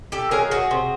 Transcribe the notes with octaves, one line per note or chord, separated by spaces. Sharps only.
G4 A4
D#3 F#3 A#3 G#4 A#4
F#4 G#4
C3